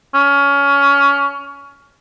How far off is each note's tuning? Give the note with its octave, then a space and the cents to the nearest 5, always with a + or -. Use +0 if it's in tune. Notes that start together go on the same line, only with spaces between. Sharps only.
C#4 +20